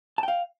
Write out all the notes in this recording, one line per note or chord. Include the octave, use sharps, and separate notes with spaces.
F5 G5 A5